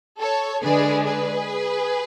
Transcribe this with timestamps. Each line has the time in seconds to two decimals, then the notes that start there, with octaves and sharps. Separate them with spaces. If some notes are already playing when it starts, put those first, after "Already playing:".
0.20 A4 C#5
0.63 D3 G#3 D4 G#4 B4
1.06 G#4 B4